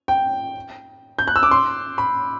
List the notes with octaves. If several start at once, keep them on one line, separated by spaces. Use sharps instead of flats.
G5
G6
F#6
E6
D6
C6
B5